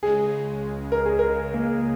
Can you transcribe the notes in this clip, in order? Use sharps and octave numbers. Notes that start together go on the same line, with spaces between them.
C#2 C#3 G#3 G#4
A#4
G#4
A#4
A#3